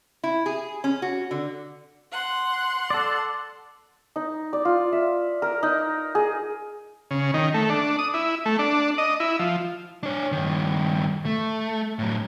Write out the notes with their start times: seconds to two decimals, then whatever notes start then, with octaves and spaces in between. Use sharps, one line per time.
0.23 E4
0.46 G#4
0.84 C#4
1.02 F#4
1.31 D3
2.12 F#5 C6
2.90 A4 D5
4.16 D#4
4.53 D5
4.65 F4
4.93 E5
5.42 A#4
5.63 D#4
6.15 G#4
7.11 C#3
7.34 D#3
7.54 A3
7.70 D4
7.99 D#6
8.14 E4
8.46 A3
8.59 D4
8.98 D#5
9.20 E4
9.39 F3
10.03 D4 C#5
10.32 G2 D#3
11.25 A3
11.99 A2 F#3